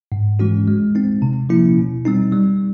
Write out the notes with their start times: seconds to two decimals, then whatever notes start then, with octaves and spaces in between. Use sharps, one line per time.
0.12 G#2
0.39 E3 G#3 C#4 F#4
0.67 G#3
0.95 C4 D#4
1.22 C3
1.49 F3 A#3 C#4 E4
1.78 B2
2.05 G3 C4 D#4
2.32 G3